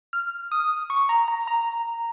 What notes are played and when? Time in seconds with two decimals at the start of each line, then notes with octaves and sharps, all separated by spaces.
0.13 F6
0.51 D#6
0.90 C#6
1.09 A#5
1.28 A#5
1.47 A#5